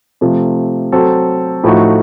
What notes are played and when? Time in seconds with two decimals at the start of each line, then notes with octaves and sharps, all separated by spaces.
0.21 C3 F3 A3
0.92 F#3 C4 F#4 A4
1.64 A2 F3 A3 D#4 F#4